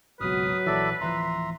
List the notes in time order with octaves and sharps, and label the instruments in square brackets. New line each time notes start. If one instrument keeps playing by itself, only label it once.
[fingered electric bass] G#1 C#2 B2 [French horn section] F#3 [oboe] B4 [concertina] D#6 F6
[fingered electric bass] A#1 E3 [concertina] A4 D5 E5
[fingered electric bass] D1 E3 F3 [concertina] E5 A#5 C6